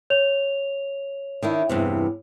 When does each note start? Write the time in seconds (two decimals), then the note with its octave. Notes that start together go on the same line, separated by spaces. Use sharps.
0.10 C#5 F7
1.42 D#3 D4 E4
1.69 E2 G2 C3